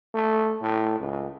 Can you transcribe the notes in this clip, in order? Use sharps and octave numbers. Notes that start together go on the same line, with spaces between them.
A3
A2
C#2